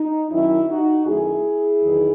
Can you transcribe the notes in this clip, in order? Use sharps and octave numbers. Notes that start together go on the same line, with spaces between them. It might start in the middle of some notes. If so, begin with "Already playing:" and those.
Already playing: D#4
F#2 D#3 F#3 C#4 E4
D#4 F#4
F#2 D#3 A3 E4 G#4
E2 D#3 F#3 B3 D#4